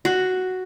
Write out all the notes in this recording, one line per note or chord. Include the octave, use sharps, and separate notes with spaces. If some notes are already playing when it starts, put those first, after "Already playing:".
F#4